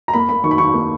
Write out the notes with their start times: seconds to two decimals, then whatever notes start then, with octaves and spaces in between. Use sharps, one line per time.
0.08 A#5
0.13 A#3 B5
0.29 A#3 B5
0.44 D#3 C#6
0.51 B5
0.58 D#3 C#6
0.74 A#3